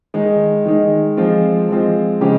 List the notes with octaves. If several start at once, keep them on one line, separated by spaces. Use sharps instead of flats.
D#3 G#3 D#4
D#3 G#3 D#4
F3 G#3 C4 F4
F3 G#3 C4 F4
C#3 F3 G#3 C#4 G4